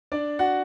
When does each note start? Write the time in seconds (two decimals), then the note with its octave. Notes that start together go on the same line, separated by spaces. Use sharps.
0.12 D4 D5
0.39 F#4 F#5